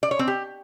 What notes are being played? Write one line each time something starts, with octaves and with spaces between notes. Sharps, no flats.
D5
C#5
C4
G4